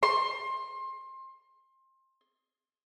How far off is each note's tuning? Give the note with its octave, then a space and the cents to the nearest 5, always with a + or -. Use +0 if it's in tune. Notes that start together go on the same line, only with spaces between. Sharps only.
C6 +25